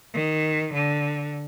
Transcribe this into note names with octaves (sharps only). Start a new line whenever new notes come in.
D#3
D3